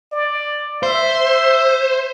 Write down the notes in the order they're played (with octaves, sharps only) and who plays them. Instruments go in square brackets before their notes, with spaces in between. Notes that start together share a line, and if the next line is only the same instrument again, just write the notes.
[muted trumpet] D5
[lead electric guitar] C5 [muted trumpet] E5